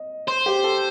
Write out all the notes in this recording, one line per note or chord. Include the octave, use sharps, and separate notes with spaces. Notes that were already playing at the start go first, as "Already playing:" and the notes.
Already playing: D#5
C5
G4
A4